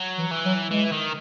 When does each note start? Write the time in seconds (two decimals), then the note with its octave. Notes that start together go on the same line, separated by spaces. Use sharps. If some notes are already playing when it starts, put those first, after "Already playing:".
Already playing: F#3
0.18 E3
0.31 E3
0.45 F#3
0.71 E3 G#3
0.92 D#3